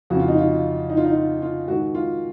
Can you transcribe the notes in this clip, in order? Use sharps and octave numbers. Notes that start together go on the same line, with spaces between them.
F2 C#3 F#4
F4
D#4
F4
D#4
F4
D#4
F4
F4
G#2 D#3 F#4
F4